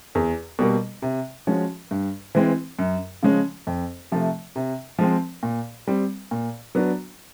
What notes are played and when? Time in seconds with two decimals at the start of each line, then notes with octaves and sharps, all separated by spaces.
0.15 E2
0.59 B2 G3 A#3
1.02 C3
1.47 F3 G#3 C#4 F#4
1.91 G2
2.35 E3 G#3 C4
2.79 F#2
3.23 C#3 F3 G#3 C#4
3.67 F2
4.12 C3 F3 A3
4.56 C3
4.99 F3 G#3 C4
5.43 A#2
5.87 G3 C4
6.31 A#2
6.75 F#3 B3 D4 F#4